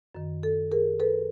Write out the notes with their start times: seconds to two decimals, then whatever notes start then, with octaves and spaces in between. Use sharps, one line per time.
0.15 F#2 D#3
0.43 A4
0.72 G#4 A#4
1.00 A4 B4